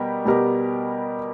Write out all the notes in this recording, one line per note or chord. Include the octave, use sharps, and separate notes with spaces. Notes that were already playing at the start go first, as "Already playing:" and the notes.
Already playing: B2 G3 B3 G4 A#4
B2 G3 B3 G4 A#4